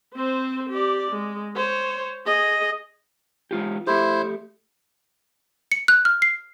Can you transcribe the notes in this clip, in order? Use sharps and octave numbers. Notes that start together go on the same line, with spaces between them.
C4 C5
G4 D5
G#3
C5 C#5
G#4 D#5
G#3 F4 G4
A3 E4 G4 C5
C#7
F#6
F6
C7